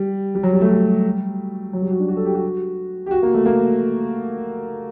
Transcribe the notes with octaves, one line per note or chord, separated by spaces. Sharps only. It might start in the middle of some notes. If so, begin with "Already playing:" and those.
Already playing: G3
G3
F#3
G3
A3
G3
F#3
G3
F#4
D4
F#4
A4
G4
F#4
G4
F#4
A#3
A3
A#3